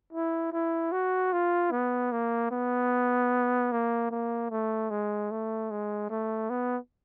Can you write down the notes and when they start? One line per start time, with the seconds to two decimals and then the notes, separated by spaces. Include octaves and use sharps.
0.13 E4
0.52 E4
0.92 F#4
1.33 F4
1.71 B3
2.12 A#3
2.51 B3
3.72 A#3
4.11 A#3
4.50 A3
4.90 G#3
5.31 A3
5.70 G#3
6.10 A3
6.50 B3